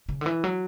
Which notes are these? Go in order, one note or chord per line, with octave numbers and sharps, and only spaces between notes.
C#3
D3
E3
F#3